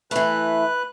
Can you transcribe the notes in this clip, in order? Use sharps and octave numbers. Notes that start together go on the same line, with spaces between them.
E3 A3 B4 F#6